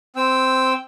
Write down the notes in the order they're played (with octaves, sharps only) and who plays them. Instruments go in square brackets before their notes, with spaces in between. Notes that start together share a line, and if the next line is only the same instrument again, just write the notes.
[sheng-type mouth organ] C4 G5 E6